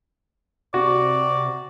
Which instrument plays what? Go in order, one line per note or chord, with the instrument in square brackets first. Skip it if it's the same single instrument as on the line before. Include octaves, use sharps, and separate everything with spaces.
[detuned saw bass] C3 [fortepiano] F#4 [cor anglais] D5